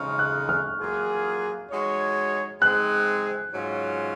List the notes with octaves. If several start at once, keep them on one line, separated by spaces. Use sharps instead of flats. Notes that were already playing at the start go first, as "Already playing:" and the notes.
Already playing: C#3 G#3 D#4 C#6 F6
F#6
F6
F#3 A#3 F4 G#4
G#3 D#4 F#4 C#5
G#3 C4 D#4 G#4 F#6
G#2 F#3 C#4 F4